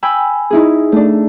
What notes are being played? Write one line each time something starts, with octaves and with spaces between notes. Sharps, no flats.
G5 G#5 B5 E6
D#4 E4 G#4
A3 D4